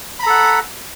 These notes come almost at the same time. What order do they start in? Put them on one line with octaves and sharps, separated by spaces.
B5 A#5 A4 F#5